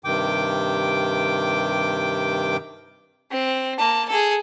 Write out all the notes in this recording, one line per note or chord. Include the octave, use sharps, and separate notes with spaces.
G2 C3 D#3 G5 D6
C4
A#3 A5
G#4 A4